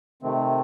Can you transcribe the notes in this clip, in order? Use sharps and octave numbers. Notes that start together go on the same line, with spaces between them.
C3 D#3 A3 C4